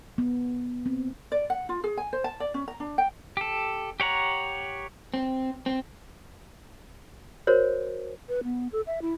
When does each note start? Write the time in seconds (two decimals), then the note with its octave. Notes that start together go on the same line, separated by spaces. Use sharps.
0.18 B3
0.86 C4
1.32 D5
1.50 F#5
1.69 F4
1.84 G#4
1.97 G#5
2.13 C5
2.24 A5
2.40 D5
2.54 C#4
2.68 A#5
2.80 D4
2.98 G5
3.37 G4 A4
4.00 G4 C#5 F#5 A#5
5.14 C4
5.66 C4
7.47 F#4 A#4 C5 C#5
8.29 B4
8.44 B3
8.72 A4
8.87 E5
9.02 E4